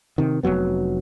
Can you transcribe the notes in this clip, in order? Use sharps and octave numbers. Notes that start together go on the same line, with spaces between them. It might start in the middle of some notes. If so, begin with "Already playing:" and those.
C3 D#3
F1 G2 F#3 B3